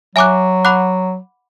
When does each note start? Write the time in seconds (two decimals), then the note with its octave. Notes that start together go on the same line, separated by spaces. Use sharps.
0.15 F#3 E5 G#5 D6 F#6
0.65 F#5 B5 D6 F#6